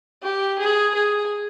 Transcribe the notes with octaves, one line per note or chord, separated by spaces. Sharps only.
G4
G#4
G#4